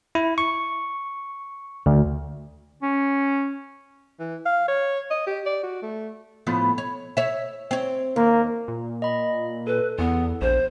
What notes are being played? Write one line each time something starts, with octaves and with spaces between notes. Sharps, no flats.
E4
C#6
D2
C#4
E3
F5
C#5
D#5
G4
D5
F#4
A3
A2 F3 B3
C#5
C#5 E5
C4 C#5
D#2 A#3
A#2
D#5 B5
A4 B4
E2 B3
A#1 C5